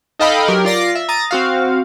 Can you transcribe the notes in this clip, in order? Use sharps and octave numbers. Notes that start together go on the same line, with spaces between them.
D#4 A4 D#5 F5 G5 B5
F#3 G4 A#4
F4 D5 A#6 C7
E5
A#5 D#6 A6
C4 F#4 F5